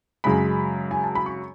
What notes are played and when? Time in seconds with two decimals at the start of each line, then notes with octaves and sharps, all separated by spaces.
0.24 F#2 C#3 G#3 B5
0.91 G#5
1.03 A5
1.15 B5
1.26 C#6